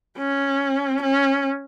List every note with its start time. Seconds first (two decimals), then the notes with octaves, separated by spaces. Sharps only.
0.18 C#4
1.02 C#4